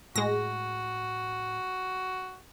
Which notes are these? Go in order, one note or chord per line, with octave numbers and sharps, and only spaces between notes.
A2 G#3 F#4 A#6